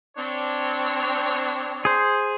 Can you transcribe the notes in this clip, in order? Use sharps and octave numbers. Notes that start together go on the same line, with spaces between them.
C4 D4 C#5
G#4 C5